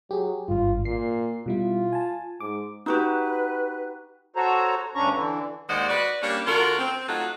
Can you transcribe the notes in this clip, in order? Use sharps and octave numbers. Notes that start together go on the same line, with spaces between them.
F#3 G4 G#4
G#1 G2 F4
A#2 C7
B2 G3 E4 F4
G#5 A5
G#2 D6
D#4 F#4 G4 B4 F#6
F#4 A4 C5 C#5 A#5
D2 G2 C#4 D4 A#5 C#6
D3 E3
D#2 D#3 G#3 C5 D5 F#5
F#4 B4 D5
G3 A#3 C#4 D4 C#5
D3 F4 F#4 A#4
C4
F#3 A3 D#4 F4 F#4 A4